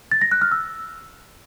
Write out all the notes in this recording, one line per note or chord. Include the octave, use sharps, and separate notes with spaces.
A6
A#6
F#6
F6
E6